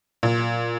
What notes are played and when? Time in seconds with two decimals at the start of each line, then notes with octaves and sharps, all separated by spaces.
0.23 A#2